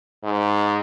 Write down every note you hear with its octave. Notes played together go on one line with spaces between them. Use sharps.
G#2